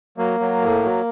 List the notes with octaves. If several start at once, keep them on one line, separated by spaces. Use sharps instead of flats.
F#3 A#3
F#3
A2
F#3